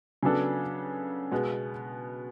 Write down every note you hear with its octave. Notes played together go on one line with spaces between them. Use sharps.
C#3 F#3 B3 D4 A4
B2 G#3 B3